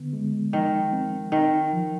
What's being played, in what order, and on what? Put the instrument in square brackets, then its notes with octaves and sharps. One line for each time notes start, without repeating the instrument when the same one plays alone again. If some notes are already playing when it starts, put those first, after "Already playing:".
Already playing: [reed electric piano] D3 B3
G#3
[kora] D#3 [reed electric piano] F3
[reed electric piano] C4
[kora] D#3 [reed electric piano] D#4
[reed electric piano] F3